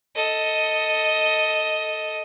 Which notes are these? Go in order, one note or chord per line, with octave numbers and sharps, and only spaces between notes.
A4 D#5